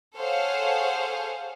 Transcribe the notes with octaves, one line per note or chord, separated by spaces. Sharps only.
G#4 A4 C5 C#5 F5 F#5